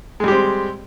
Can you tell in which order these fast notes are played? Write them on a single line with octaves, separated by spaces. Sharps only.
G#3 G3 G4 C4